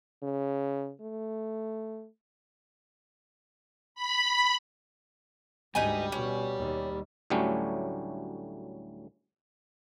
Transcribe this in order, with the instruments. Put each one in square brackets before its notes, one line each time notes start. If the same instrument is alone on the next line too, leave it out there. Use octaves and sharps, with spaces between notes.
[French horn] C#3
A3
[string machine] B5
[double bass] D2 G#2 [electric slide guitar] G3 G4 [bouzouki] D#4 B4 G#5
[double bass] B2 [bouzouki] C#4
[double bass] D#2
[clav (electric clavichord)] D2 A2 F#3 G3 A3 C#4